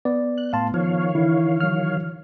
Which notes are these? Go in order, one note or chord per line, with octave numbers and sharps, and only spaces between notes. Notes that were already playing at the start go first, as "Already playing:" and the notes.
B3 D5
F#6
A2 F5 A5 C6
D#3 F3 C#5 F5
D3 E3 E4
F#3 F6